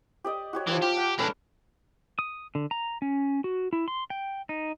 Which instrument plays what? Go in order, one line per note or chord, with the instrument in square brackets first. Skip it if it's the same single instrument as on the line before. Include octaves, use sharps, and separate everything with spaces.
[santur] G4 D5 D#5
F#4 G4 C#5
[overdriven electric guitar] E3 [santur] F3 G5 D6
[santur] F4 [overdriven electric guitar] G4
[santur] F#5
[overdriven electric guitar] G#3 D4 [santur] C#4 A4 B4
[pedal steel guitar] D#6
D3
A#5
C#4
F#4
E4
C6
G5
D#4